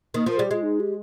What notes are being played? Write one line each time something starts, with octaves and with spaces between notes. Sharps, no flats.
D#3 A#3
F3 A#4
G3 G#4
G4
G#3 F4
D#4
G4